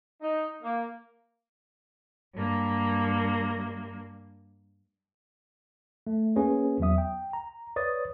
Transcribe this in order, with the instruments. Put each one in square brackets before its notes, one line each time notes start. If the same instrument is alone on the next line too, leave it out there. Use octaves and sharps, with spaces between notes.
[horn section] D#4
A#3
[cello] G2 A#3
[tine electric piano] A3
A#3 C#4 G#4 B4 C#5
E2 F#3 B3 E5 D#6
G5
A#5
B4 C#5 D5 D#6 A6